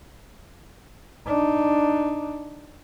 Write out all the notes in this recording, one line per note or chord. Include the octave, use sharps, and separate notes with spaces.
D4 D#4